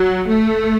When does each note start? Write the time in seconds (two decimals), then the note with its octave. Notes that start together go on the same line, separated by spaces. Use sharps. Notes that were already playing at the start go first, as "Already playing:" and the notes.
Already playing: F#3
0.29 A3